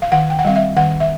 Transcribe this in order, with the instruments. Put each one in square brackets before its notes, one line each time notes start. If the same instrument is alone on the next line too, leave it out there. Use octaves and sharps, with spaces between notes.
[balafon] F5
D#3 F#5
G5
F#5
G3 C4 F5
E5
D#3 F#5
E5